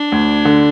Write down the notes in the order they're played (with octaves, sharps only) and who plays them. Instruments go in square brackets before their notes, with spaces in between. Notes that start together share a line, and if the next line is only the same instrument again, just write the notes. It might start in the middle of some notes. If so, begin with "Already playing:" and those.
Already playing: [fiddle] D4
[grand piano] D2
D3